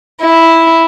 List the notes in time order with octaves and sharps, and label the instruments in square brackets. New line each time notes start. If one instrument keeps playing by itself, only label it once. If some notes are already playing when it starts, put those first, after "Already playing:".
[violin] E4